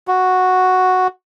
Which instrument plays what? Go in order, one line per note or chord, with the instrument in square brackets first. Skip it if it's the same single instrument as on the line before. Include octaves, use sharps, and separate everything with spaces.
[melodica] F#4